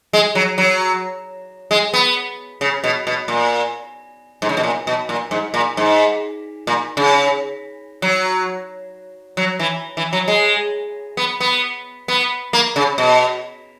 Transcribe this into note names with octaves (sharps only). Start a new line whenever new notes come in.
G#3
F#3
F#3
G#3
B3
C#3
B2
B2
A#2
G#2
C#3
B2
A#2
B2
A#2
G#2
A#2
G#2
A#2
C#3
F#3
F#3
E3
E3
F#3
G#3
B3
B3
B3
A#3
C#3
B2